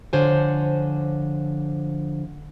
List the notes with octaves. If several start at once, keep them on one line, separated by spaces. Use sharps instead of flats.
D3 F3 C5 C#5 G#5